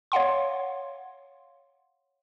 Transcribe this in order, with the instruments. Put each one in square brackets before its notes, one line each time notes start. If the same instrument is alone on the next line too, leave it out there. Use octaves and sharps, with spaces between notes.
[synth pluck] C#5 F5 F#5 C6